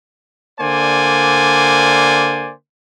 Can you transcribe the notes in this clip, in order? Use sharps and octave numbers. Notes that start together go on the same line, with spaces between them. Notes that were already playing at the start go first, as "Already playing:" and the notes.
D3 A#3 C5 D5 G#5